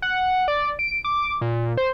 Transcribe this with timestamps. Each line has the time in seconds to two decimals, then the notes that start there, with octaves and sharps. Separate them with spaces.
0.02 F#5
0.48 D5
0.79 D7
1.04 D6
1.41 A#2
1.77 C5